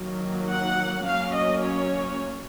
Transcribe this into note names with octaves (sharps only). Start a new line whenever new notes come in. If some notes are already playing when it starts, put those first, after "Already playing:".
Already playing: D#3 F#3 A#3
F#5
F#3 A#3 C#4 F5
D#5
C#5